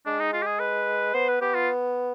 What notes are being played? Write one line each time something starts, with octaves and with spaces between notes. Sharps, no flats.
G#3 D4
D#4
F4
G4
G#4
B4
B3 C5
B4
B3 G4
F4